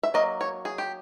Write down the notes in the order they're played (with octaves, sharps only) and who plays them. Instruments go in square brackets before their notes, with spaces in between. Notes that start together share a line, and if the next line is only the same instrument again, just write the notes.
[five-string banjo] E5
F#3 A#3 D#5
C#5
G#4
G4